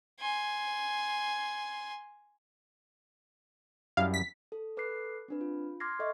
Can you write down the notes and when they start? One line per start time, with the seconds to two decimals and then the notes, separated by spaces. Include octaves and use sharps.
0.20 G#5 C6
3.97 F#2 G3 E4 F5
4.14 B6
4.52 A4
4.77 A4 B4 D6 F#6 C7
5.28 C4 D4 B4
5.41 F4
5.80 C6 D6 F6 G#6 A#6 C7
5.99 A4 D#5 E5 C#6